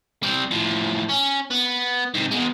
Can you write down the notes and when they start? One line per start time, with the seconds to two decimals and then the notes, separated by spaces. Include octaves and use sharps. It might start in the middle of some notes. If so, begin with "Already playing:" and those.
0.23 G3 C4
0.51 A2 F3
1.09 C#4
1.50 B3
2.15 G#2 C3
2.32 B2 G#3